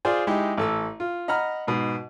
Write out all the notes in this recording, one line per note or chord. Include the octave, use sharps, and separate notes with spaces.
F4 G#4 C5 D5
G#3 D#4 E4 G4
A1 A4 E6
F4
D#5 F#5 A#5 B5 F6
G#2 B2